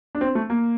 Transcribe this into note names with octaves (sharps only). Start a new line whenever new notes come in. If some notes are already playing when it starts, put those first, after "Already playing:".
D4
C4
A3
A#3